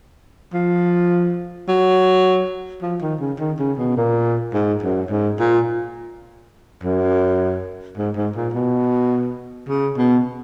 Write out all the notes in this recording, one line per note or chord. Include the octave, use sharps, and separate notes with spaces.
F3
F#3
F3
D#3
C#3
D#3
C#3
B2
A#2
G#2
F#2
G#2
A#2
F#2
G#2
G#2
A#2
B2
C#3
B2